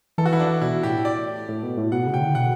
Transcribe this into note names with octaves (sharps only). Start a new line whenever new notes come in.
E3 A4
F#4
E4
D4
B2 E4
A2 G4
D5
A2
B2
A2
B2 F#5
C#3
G5
D3
B2 F#5